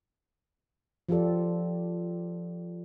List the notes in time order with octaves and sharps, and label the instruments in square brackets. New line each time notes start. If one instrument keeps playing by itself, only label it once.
[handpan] F3 F4 G4 A4 D5